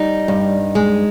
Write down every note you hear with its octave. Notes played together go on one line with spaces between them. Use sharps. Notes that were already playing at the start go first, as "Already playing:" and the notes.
Already playing: G3 D#4
G2
G#3